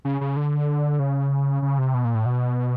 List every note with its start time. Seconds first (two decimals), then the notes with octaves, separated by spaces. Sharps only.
0.05 C#3
0.21 C#3
0.36 D3
0.99 C#3
1.62 C#3
1.78 C3
1.94 B2
2.05 A#2
2.15 A2
2.26 B2